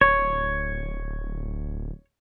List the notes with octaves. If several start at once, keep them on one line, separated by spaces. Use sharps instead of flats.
D1 C#5